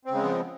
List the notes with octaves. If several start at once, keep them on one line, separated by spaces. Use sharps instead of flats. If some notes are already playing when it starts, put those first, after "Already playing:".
C#3 F3 G#3 B3 C4